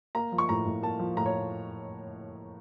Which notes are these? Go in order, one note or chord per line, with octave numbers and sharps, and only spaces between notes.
A#3 A#5
F3
C#6
A2 A#5
A2
A#3 A5
F3
A2 A#5
C#5